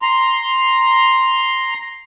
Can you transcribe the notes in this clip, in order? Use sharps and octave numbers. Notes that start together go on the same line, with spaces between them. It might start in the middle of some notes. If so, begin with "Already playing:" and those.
A#5 C6